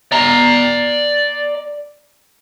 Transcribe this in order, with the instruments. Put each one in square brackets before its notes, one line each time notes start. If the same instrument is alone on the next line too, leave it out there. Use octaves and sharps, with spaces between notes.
[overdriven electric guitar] D5 A#5